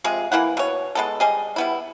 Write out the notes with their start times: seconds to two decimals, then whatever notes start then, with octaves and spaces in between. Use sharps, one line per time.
0.04 C3 F3 G#3 G#4
0.32 E3 A#3 E4 F#5
0.57 B2 C#5
0.95 G#3 B3 A4
1.20 G3 G#4 D#5
1.56 G3 B3 E4